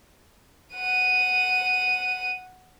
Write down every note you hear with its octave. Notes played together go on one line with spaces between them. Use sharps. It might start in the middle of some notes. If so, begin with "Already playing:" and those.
F#5 D#7